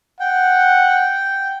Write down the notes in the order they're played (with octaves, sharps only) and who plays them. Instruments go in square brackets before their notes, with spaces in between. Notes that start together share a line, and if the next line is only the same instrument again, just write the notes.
[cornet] F#5 [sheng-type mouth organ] G5